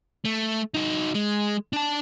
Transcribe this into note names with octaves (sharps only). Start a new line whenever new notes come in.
A3
D#4 F#4
G#3
D4 A5